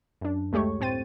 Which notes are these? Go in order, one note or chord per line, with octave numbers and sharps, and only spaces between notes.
F#2 D4
D2 G#3 A3 G4 C#5 C#6
A2 C4 C5 G5 A6 D#7